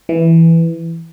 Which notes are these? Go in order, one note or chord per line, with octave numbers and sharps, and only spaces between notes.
E3